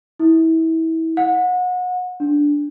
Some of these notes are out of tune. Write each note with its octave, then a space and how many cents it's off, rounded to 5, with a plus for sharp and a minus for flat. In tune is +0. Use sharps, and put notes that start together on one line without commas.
E4 -30
F#5 -30
D4 -5